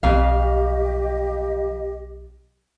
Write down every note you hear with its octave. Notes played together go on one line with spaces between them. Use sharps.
B1 F2 F4 G4 D#5 F5